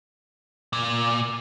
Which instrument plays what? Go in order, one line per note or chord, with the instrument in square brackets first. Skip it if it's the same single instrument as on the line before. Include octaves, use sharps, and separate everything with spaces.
[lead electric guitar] A#2